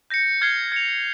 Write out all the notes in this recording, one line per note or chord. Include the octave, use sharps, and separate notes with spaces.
G6 A#6 C#7
F6 G#6 C7 G7
G#6 C#7 F7